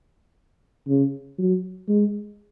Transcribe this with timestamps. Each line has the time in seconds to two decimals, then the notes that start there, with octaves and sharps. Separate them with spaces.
0.88 C#3
1.38 F#3
1.88 G#3